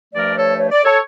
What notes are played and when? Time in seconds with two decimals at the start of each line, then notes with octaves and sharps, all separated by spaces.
0.14 G2 F3 A3 A#4 D5
0.36 A4 C#5
0.57 C#5
0.71 D5
0.85 A4 C#5